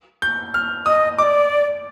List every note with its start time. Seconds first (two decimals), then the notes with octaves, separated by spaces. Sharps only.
0.22 G6
0.54 F6
0.86 D#5 D#6
1.18 D5 D#5 D6